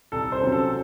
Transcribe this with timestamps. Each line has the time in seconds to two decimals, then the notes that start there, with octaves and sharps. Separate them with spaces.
0.12 C2 A4
0.32 C5
0.42 C3 F#3 C#4
0.52 A4